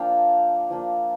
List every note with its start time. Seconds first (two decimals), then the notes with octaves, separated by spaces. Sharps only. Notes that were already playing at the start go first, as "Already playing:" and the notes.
Already playing: F3 A#3 D4 F5 G5
0.70 F3 A#3 D4